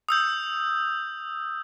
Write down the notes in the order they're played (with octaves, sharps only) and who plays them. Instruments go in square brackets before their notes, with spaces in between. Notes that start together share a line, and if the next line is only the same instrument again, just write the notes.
[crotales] D#6 E6 G6